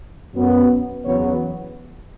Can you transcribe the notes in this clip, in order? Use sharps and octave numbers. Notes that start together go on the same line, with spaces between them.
F#2 F#3 B3
E2 C#3 F#3 B3 C#5